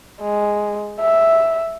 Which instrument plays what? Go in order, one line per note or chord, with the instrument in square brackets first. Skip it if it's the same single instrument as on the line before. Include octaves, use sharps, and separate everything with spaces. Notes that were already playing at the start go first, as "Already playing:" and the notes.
[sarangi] G#3
E5